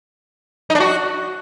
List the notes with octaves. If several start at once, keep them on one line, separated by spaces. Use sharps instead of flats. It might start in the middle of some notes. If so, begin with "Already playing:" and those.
D#4
D4
F#4